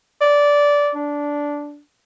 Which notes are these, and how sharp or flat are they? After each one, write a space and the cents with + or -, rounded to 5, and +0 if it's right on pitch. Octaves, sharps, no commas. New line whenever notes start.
D5 -15
D4 -10